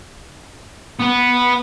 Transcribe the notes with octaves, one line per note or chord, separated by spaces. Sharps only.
B3 B4